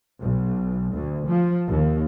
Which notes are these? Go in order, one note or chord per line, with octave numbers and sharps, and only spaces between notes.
B1
D2
F3
D#2